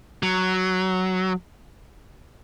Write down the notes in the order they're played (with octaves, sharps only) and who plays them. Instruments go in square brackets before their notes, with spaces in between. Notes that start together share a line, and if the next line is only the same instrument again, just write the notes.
[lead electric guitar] F#3